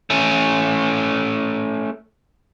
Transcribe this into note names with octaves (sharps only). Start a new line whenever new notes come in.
A3 C#4